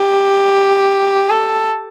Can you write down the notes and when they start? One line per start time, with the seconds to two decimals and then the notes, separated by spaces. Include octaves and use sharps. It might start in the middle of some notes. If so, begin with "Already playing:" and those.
Already playing: G4
1.30 A4